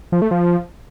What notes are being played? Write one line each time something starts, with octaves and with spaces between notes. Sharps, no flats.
F3
A3
F3